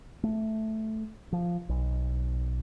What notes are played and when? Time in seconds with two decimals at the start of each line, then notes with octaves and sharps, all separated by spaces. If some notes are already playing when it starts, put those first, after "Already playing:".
0.23 A3
1.32 F3
1.69 B1